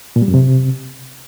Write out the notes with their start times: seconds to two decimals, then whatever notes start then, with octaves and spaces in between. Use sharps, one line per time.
0.16 A#2
0.22 G3
0.28 F#2
0.34 C3